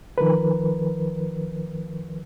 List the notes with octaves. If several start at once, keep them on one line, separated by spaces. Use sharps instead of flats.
D#3 F3 A#4 B4